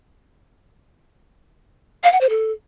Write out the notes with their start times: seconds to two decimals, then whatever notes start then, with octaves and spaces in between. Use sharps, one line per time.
2.04 F5
2.12 F#5
2.21 C5
2.30 A4